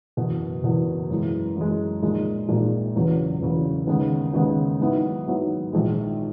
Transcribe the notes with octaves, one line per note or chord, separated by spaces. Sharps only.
F#1 E2 B2
F#1 E2 B2
F#2 E3 G#3
F#2 E3 G#3
A#1 A#2 G#3 D#4
A#1 A#2 G#3 D#4
E1 E2 C#3 F#3
E1 E2 C#3 F#3
D#2 C#3 G#3 B3
D#2 C#3 G#3 B3
G#2 D#3 F#3 B3 E4
G#2 D#3 F#3 B3 E4
A#1 G#2 D#3 G#3